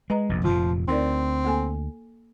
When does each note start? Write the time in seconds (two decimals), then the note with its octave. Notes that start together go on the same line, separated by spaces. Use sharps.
0.10 G#3 B4 D#5 A#5
0.29 F1 A#1 F2
0.44 F1 A#2 F3 F4
0.88 D2 C4 D#4 A#4 D5
1.45 A#3 A4 G#5